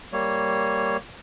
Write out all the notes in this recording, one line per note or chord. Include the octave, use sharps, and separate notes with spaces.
G3 A#3 C#5